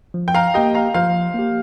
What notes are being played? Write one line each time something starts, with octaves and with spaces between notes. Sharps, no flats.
F3
G5
F5 A#5
A#3 G4 D#5 G5
F5 A#5
F3 C5 F5
A#3 G4